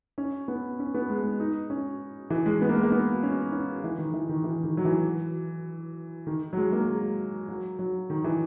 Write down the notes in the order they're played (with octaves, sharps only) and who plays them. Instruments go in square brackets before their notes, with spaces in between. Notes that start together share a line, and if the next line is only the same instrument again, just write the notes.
[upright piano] C#4
B3
C#4
B3
G#3
G#3
D#4
C#4
E3
G#3
B3
A#3
G#3
A#3
B3
C#4
C#4
E3
D#3
E3
D#3
E3
D#3
F#3
E3
D#3
F#3
G#3
A#3
G#3
F#3
F#3
D#3
E3